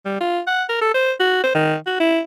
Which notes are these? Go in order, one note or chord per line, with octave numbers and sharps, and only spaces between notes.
G3
F4
F#5
A#4
A4
C5
F#4
C5
D#3
F#4
E4